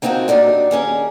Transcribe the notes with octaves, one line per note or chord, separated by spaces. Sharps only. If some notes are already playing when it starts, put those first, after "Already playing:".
A#3 C4 D#4 F4 F#4 A4
F#3 D4 D#4 G4
D#2 C#4 G#4 A#4